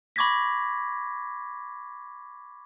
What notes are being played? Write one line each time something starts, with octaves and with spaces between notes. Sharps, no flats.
B5 C#6 D6 G#6 A#6 B6